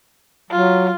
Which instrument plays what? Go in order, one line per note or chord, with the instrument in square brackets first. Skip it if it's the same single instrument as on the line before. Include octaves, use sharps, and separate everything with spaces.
[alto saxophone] F#3 [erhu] F4